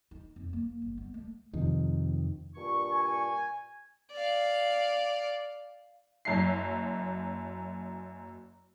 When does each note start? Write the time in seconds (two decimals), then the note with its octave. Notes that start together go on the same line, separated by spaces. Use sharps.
0.11 D#4
0.36 F2
0.53 A#3
0.82 G1
0.98 B3
1.14 A3
1.53 F2 C3 D#3
2.55 G2 A#2 C#6
2.92 G#5
4.12 D5 F5
6.25 F#1 F#2 E4 C7